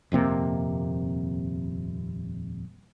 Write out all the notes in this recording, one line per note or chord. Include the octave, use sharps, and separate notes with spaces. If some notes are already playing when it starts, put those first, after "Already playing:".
D#1 F2 C3 A#3